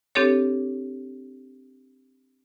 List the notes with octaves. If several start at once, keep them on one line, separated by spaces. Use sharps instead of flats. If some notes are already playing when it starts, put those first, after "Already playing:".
C4 D4 G4 A4 C#5